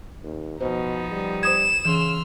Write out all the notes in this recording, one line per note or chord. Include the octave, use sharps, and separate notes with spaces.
D#2
B2 F3 B3 D#4 C5
G3
C5 D#6 G#6 E7
C#3 E3 C6 E6 F6